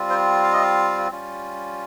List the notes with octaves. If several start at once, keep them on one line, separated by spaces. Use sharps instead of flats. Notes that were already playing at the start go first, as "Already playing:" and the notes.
Already playing: G3 C4 F4
C5
F5
D#5
F5
G3 C#4 F4